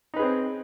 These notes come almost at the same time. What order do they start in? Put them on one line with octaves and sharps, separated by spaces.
D#4 B4 G#4 C4